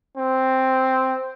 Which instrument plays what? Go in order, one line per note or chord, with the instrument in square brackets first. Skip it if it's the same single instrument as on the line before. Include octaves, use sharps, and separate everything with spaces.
[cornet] C4